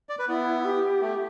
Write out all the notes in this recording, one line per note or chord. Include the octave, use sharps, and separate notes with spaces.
D5
B4
B3 E4
G4
A3